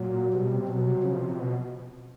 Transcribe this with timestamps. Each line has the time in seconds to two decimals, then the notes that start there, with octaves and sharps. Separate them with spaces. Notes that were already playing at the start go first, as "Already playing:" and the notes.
Already playing: A#2 F#3
0.34 B2 G3
0.52 C3
0.68 B2 F#3
0.87 C3
1.03 C#3 F3
1.16 B2
1.21 C3
1.39 B2